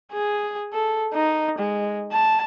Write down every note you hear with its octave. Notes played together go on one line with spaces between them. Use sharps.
G#4
A4
D#4
G#3
A5